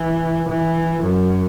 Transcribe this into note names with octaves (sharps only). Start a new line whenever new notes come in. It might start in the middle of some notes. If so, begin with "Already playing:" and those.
Already playing: E3
E3
F#2